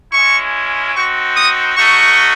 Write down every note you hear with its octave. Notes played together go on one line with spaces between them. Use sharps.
G#3 C#4 E4 C#6
C4 D#4 F#4 C#6
D#6
A3 D#4 F#4 C#6